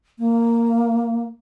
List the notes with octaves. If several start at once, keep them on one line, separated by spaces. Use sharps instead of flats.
A#3